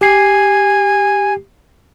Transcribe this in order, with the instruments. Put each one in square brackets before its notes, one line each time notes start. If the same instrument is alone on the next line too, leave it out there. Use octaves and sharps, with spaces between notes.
[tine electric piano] G4 C7 [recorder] G#5